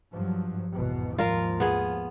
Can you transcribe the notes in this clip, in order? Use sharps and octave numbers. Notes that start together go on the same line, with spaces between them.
G2 F3 F#3
G#1 E2 B2
D#2 G#2 F3 F4 A#4 F5
B3 G#4